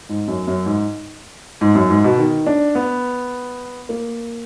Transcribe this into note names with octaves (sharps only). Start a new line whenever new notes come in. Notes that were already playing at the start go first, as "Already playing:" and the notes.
G#2
F#2
F#2
G#2
G#2
F#2
G#2
B2
D#3
D4
B3
A#3